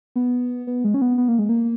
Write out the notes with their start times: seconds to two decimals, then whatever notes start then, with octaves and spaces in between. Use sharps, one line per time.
0.16 B3
0.67 B3
0.84 G#3
0.94 C#4
1.02 B3
1.18 B3
1.28 A#3
1.39 G#3
1.49 A#3